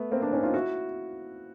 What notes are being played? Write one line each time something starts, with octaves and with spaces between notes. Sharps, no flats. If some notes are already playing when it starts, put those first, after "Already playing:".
Already playing: A3 B3
A#3 C4
C4 D4
C#4 D#4
D#4 F4
E4 F#4